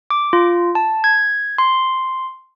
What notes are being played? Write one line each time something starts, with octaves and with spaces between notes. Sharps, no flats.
D6
F4
A5
G#6
C6